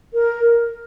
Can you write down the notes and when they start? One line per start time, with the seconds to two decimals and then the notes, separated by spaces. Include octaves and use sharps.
0.13 A#4